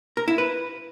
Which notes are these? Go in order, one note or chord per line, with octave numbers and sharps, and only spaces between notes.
A#4
E4
B4